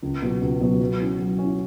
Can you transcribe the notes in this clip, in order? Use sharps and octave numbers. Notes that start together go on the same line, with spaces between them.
C#2
B2 F#3 B3 F#4
C#2
B2 F#3 B3 F#4
F#3
C#4 E4
F#3
C#4 E4